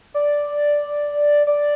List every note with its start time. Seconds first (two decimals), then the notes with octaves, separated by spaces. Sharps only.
0.14 D5
1.47 D5